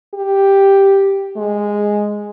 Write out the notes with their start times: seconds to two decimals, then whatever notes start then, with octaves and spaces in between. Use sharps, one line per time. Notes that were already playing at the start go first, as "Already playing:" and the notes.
0.14 G4
1.37 G#3